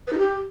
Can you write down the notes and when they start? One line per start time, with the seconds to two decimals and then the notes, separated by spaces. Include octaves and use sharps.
0.07 B4
0.13 D#4
0.18 G4